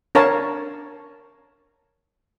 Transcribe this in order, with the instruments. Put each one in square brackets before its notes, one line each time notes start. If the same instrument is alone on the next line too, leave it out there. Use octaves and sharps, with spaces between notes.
[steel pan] D4 A#4 C#5 F5 A5